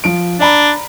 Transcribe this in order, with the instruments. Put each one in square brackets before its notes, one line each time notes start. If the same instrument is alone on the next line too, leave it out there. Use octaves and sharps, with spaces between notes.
[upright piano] F3 D7
[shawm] D4 [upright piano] D5 A#5 B5